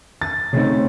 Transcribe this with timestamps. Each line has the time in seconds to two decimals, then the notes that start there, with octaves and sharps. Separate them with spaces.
0.22 A6
0.53 C#3 A3 C4 D#4